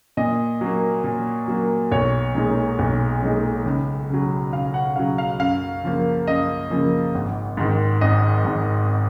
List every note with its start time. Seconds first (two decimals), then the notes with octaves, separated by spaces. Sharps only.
0.17 A#2 D#5
0.61 F#3 A#3
1.04 A#2
1.48 F#3 A#3
1.92 B1 C#5
2.35 A#2 G#3 D#4
2.79 B1
3.22 A#2 G#3 D#4
3.65 C#2
4.10 C#3 F#3
4.53 C#2 F5
4.74 F#5
4.96 C#3 F#3 F5
5.18 F5
5.39 F#2 F5
5.83 C#3 F3 A#3
6.27 F#2 D#5
6.70 C#3 F3 A#3
7.15 G#1
7.57 G#2 D#3
8.01 G#1 D#5
8.45 G#2 D#3